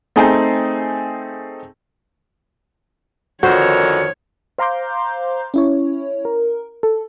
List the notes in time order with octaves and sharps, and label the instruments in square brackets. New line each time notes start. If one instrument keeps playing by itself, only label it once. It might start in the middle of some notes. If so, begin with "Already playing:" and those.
[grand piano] A3 C4 D#4 G#4 G5
[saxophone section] F2 D3 D#3 [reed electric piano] F#4 [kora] C5 [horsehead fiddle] C#5
[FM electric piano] C5 F5 A#5 C6 D6 G6
C#4 E4 C#5
A#4
A4